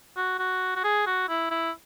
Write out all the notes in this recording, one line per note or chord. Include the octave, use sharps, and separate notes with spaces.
F#4
F#4
F#4
G#4
F#4
E4
E4